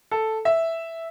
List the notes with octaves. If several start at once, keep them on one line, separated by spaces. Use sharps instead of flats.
A4
E5